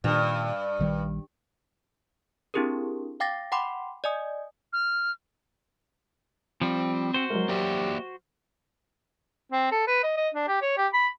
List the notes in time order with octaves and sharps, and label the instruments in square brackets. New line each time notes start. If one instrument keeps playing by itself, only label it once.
[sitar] G2 [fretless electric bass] A#2 D#3
[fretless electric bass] A#1 D#3 G3
[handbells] C4 D4 E4 G4 G#4 A#4
F5 G5 D6 A6 A#6
F#5 G5 B5 C6 D6
D5 D#5 G#5 D#6
[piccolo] F6
[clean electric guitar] F3 G3 [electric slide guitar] C4
[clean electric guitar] F#4 C5
[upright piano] F#3 A#4 [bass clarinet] G#3
[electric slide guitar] A#3 D5 E5 [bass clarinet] G4
[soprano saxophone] C4
A4
B4
D#5
D#5
D4
G4
C#5
G4
B5